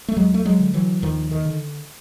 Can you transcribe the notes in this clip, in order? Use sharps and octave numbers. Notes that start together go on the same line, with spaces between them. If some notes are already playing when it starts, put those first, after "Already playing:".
A3
D#2 F#3 G#3
A3
F#3 G#3
D3
E3 F#3
D#2 D#3 F3
D#3
D3